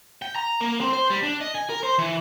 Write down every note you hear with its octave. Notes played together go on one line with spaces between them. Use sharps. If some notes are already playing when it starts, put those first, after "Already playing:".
G5
A#5
A#3
C4
C5
G3
D4
D#5
G#5
A#4
C5
E3